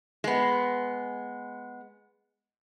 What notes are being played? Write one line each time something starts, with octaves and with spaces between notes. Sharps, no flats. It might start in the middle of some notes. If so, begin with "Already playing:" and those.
G#3 B3